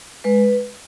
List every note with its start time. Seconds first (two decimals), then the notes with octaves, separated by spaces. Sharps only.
0.24 G#3 B4